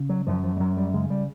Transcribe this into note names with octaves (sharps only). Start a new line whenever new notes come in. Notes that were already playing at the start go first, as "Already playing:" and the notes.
Already playing: C#3
F#3
F#2 F3
F3
G3
F#2 F#3
G3
C#3 G#3
G3